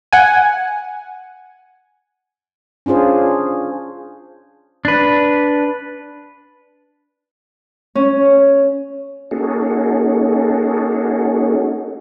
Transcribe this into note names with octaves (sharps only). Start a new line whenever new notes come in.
F#5 G#5
C#4 D4 F4 G#4 C5
D4 B4
C#4
A#3 C#4 D#4 F#4 G#4 A4